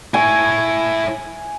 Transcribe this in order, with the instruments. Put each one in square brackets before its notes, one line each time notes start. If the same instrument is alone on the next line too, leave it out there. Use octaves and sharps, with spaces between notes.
[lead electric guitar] E4 C#5 [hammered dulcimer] G#5